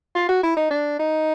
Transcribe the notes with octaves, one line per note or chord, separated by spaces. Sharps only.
F4
F#4
E4
D#4
D4
D#4